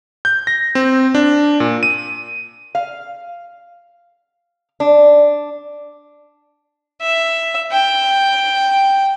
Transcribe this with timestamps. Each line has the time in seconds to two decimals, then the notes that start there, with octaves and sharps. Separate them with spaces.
0.25 G6
0.47 A#6
0.75 C4
1.15 D4
1.60 A#2
1.83 D#7
2.75 F5
4.80 D4
7.01 E5
7.72 G5